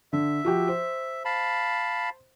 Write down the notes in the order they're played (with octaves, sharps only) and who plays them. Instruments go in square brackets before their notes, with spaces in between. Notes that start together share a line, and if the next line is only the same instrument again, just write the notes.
[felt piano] D3 [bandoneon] E5
[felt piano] F3 F#4 G4
C5
[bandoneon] F5 A5 B5